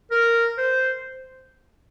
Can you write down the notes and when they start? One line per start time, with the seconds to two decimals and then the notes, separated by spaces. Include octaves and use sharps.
0.11 A#4
0.58 C5